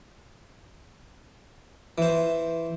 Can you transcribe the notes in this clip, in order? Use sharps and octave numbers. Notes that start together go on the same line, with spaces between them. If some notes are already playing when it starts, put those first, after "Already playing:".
E3 C5